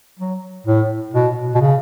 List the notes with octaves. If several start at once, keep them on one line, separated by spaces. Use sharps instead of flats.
F#3
A2
B2
B2
C#3